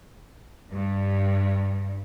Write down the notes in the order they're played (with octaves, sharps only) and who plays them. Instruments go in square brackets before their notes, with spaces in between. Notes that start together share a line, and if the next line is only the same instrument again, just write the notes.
[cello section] G2